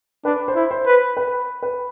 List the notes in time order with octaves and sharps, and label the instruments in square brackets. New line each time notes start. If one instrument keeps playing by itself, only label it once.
[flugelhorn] D4 [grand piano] B4
[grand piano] C5
[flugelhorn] E4
[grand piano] C5
[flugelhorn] B4
[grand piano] B4
B4